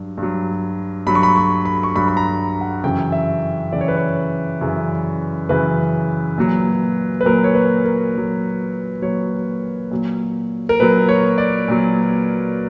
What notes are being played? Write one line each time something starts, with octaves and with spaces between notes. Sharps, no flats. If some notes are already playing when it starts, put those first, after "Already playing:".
Already playing: G2 F#3
G2
F#3
G2 F#3 B5
C#6
B5
C#6
B5
C#6
G2 F#3 B5
B5
A#5
F#5
F#2 C#3 E3 G5
E5
F#2 C#3 E3 D5
C#5
B4
C#5
F#2 C#3 E3
F#2 C#3 E3 B4
A#2 F#3
B4
A#2 F#3 A#4
C#5
B4
A#4
A#2 F#3
A#2 F#3 C#5
A#2 F#3
A#4
A#2 F#3 B4
C#5
D5
A#2 F#3